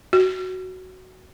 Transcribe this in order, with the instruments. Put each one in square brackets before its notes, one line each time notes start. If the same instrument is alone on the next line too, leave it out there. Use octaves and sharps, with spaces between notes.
[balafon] F#4